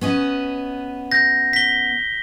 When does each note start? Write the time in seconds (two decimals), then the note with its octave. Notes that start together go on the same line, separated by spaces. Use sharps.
0.01 B3 C#4 D#5
1.12 G6 A#6
1.53 B6 G7